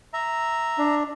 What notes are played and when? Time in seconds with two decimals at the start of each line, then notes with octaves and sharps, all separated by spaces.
0.13 E5 A#5
0.78 D4